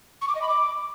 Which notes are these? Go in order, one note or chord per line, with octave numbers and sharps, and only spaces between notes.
C#6
D6
D#5
B5
D6